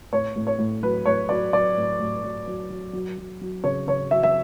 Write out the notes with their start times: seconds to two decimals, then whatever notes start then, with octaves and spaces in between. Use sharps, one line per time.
0.12 A2 C#5
0.36 A2
0.47 C#5
0.59 A2
0.83 F#3 B4
1.06 A2 C#5
1.29 F#3 D5
1.53 F#3 D5
1.77 A2
2.00 A2
2.23 F#3
2.47 F#3
2.70 F#3
2.93 F#3
3.18 F#3
3.41 F#3
3.64 C#3 C#5
3.87 C#3 C#5
4.11 F#3 E5
4.23 E5